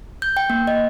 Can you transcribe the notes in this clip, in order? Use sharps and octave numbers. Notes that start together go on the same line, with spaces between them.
G6
G5
A#3
D#5